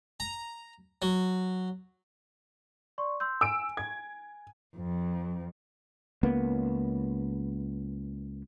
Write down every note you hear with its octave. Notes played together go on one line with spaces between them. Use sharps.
A#5
F#3
D5 C6 C#6
C6 E6 G6
G#5 E6 D7
G#6
F2
C#2 A#3 B3